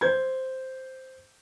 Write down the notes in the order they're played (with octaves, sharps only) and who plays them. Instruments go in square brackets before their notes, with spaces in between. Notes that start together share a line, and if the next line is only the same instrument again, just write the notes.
[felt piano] C5 G6 G#6